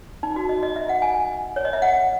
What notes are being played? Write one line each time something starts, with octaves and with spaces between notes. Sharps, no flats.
D#4
F#4
D#5
D#5
E5
F#5
G#5
C#5
D#5
E5
F#5